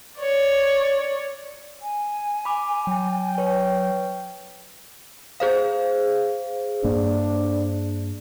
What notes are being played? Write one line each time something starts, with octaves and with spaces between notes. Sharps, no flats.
C#5 D5
G#5
B5 D6
F#3 G5
B4 C#5
G#4 C5 F5
G2 A#3 D4